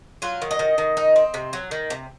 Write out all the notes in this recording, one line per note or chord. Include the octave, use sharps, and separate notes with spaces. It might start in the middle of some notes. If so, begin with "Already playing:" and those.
F#3 F4
D#3
D#5
D#3
D#3
D#4
C4
C3
F#3
D#3
C3